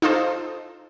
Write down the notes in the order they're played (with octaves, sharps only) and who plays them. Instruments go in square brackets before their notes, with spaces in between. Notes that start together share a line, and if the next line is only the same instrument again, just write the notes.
[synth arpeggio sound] D#4 F4 A4 C5